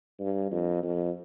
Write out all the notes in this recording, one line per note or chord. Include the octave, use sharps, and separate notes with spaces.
G2
F2
F2